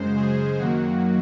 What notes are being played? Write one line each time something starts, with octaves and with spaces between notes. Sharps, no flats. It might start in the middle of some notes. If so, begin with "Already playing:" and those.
Already playing: F#2 C#3 G#3 C5
G#4
F#2 D#3 F#3 A#3 F#4